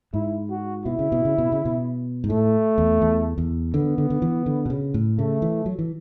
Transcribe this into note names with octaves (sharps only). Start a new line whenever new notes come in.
G#2 E4
F#4
B2 E4
C#3
B2
C#3
B2
C#3
B2
G#2
A2 A3
E2
E2
E2
D3 B3
D3
D3
E3
D3
B2
C#3
A2
C#3 A3
E3
F#3
E3